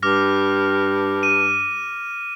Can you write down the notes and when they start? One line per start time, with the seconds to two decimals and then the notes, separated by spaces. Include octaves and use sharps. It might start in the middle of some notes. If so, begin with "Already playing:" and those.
0.03 G2 D6 F6 A#6
1.23 D#7